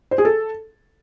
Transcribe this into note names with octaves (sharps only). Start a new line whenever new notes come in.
C5
G#4
A4